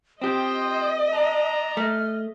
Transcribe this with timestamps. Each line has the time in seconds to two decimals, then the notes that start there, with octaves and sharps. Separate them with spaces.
0.22 C4 F4 G4 C5 D#5 G5 D#6
1.12 D4 A5 A#5
1.77 A3 F6